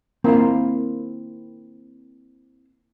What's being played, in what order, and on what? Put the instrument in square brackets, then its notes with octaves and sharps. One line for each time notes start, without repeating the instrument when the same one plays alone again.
[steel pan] A#3 [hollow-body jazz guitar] C4 E4 F5